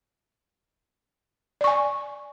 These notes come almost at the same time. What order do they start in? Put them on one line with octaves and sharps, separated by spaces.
D5 C#6 G#5